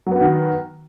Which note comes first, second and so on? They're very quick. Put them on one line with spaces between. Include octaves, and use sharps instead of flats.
F#3 B3 F#4 D#3